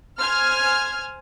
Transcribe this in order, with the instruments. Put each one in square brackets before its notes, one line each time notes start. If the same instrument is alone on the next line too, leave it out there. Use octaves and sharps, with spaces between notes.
[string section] C5 G#5 F6 G#6